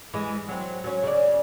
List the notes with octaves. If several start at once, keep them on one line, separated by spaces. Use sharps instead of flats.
E3 G#3
F#3 C4
F#3 C#4
C#3 D5